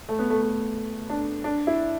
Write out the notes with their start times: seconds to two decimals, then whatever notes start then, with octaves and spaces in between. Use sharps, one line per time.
0.09 A3
0.19 B3
0.30 A3
0.42 A3
1.10 D4
1.44 D4
1.67 E4